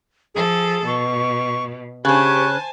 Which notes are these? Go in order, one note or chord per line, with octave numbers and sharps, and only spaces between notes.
F3 G#4 A4
B2 C#6
C#3 C#4 G4 C5 G#5 A5 C#6 F#6